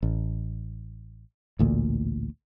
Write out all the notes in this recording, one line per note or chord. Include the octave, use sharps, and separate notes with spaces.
A1
A1 D2 A#2